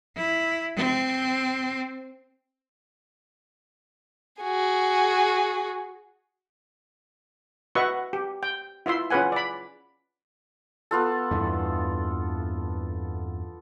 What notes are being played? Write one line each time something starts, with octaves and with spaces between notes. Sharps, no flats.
E4
C4
F#4 G#4
F#4 B4 D#5 E5 F#5 C#6
G4
G5
E4 F4 E5 C6
C#4 F4 G#4 B4 F#5 G#5
D5 B5
B3 F4 A4
E2 G2 E3